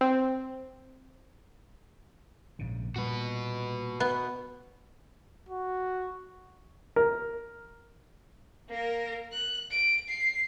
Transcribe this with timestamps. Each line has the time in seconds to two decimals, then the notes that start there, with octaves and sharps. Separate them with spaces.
0.01 C4
2.59 A#1 G#2 C#3
2.96 A#2 G3 A#3 F#4 B4
4.00 B3
5.49 F#4
6.96 A#4
8.69 A#3 A#4
9.33 F#6
9.71 D7
10.08 C7